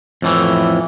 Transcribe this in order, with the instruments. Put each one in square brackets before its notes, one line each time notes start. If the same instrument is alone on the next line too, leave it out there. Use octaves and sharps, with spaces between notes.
[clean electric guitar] F2 A2 E3